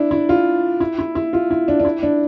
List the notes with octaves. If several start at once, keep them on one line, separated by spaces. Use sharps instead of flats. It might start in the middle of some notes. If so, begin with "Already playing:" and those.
Already playing: D4 E4
E4
F4
E4
E4
E4
F4
E4
D4
D4
E4
D4